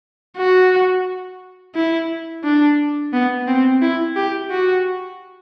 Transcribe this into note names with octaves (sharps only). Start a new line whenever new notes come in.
F#4
E4
D4
B3
C4
E4
G4
F#4